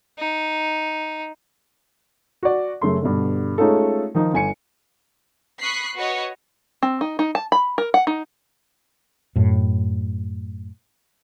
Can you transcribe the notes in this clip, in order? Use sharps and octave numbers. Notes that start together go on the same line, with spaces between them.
D#4
F#4 D5
F#2 C#3 A3 C6
G2 B2 D3
G#3 A3 C#4 D#4 F4 A4
D#3 F3 D#4 F4
G1 G#5 C#7
B5 C#6 D#6 F#6 B6 C7
F#4 B4 C#5 D#5
C4
D#4
D#4
A5
B5
A#4
F#5
D#4
F#2 A2